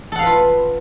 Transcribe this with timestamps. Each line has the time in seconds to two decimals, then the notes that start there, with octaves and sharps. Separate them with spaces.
0.12 A4
0.15 F#5
0.19 F5
0.23 B4
0.26 F4